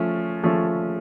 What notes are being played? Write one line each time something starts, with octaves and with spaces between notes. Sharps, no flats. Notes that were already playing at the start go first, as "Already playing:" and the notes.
Already playing: F3 A3 C#4
F3 A3 C#4